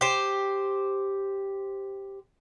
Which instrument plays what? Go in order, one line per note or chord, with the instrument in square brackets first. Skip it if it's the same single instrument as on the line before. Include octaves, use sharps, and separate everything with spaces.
[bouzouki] G4 C5